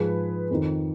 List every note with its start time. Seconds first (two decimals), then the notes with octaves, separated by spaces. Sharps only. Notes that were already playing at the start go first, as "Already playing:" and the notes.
Already playing: G#2 F3 G#4 B4
0.51 F2 D#3